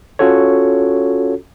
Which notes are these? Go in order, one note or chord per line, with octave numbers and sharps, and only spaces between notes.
C#4 F4 F#4 A4 C#5